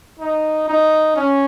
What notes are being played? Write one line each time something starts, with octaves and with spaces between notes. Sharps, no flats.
D#4
D#4
C#4